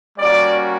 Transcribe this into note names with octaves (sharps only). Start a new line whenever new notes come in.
G3 A#3 C#4 F#4 D5